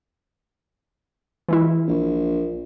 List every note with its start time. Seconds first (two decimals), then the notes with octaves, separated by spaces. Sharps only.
1.49 E3 G#3 E4
1.88 A#1